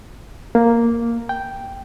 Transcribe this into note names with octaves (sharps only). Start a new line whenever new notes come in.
A#3
G5